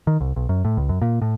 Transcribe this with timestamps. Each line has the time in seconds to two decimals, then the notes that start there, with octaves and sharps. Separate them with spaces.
0.07 D#3
0.21 C2
0.36 B1
0.49 F#2
0.65 A2
0.77 C#2
0.89 F#2
1.02 A#2
1.22 A2